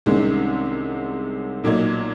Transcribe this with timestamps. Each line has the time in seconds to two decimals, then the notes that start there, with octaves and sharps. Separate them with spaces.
0.06 C2 C3 D#3 G#3 C#4
1.64 B1 A#2 F#3 A#3 D#4